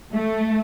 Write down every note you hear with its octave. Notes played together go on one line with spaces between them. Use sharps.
A3